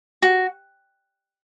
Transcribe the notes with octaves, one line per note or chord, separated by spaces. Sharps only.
F#4